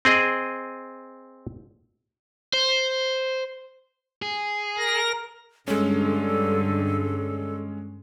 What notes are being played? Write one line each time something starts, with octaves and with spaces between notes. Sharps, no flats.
C4 G#4 D#5
C5
G#4
A#4 A#6
G2 D3 G#3 C#4 A4